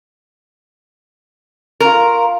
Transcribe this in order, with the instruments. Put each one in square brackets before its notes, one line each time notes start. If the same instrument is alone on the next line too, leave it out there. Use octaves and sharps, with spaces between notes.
[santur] F4 C#6 [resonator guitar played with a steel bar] A#4